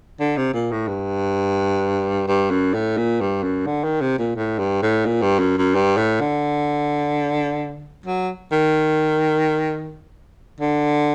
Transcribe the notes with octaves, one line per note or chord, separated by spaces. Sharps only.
D3
C3
A#2
A2
G2
G2
F#2
A2
A#2
G2
F#2
D3
D#3
C3
A#2
A2
G2
A2
A#2
G2
F#2
F#2
G2
A2
D3
F#3
D#3
D3